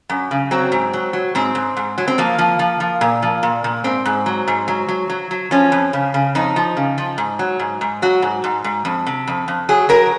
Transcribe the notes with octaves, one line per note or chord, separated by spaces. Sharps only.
F#2
C#3
F#3 C4
G#2
F#3
F#3
G#2 C4
G#2
G#2
F#3
C4
F3 A#3
F3
F3
F3
A#2
F3
A#2
A#2
G#2 C4
G#2
F#3
G#2
F#3
F#3
F#3
F#3
F3 C#4
F2
C#3
C#3
F2 D#4
F3
C#3
F3
G#2
F#3
G#2
G#2
F#3 F#4
G#2
G#2
G#2
F2
C3
F2
F2
F#3 G#4
F#3 A#4